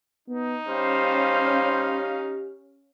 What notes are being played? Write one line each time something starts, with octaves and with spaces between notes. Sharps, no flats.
B3 D#4
G3 C#4 G4 C5 F5